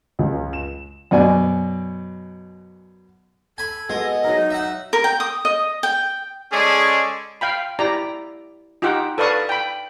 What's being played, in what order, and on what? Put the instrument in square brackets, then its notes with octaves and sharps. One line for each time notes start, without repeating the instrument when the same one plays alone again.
[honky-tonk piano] C#2
E7
[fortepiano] F#2 B2 D5 G#5
[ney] A4 [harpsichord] G#5 B5
[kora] G#3 [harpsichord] B3 [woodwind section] F#4 G#4 D#5
[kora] F#3 A#4 [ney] D#4
[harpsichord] E5 F#5
[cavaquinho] A#4
G5
D#6
D#5
G5
[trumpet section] G#3 C#4 G#4 A4 D5
[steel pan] F5 G5 B5
E4 G4 D5 A#5
D#4 F4 G4 F#5 G5
A4 B4 D5 F5 C#6 D#6
G5 B5